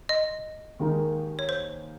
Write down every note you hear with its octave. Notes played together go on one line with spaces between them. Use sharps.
D#5
D#2 D#3 G#3 D#4 A#4
C#5
C5